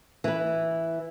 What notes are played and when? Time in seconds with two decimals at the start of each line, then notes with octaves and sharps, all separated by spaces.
0.24 E3 B4